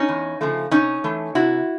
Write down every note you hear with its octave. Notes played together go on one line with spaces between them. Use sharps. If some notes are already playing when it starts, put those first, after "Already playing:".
Already playing: C#4 D#4
E2
C#3 F3 A3
C3 C#4 D#4
E3 A3
C3 E4 F#4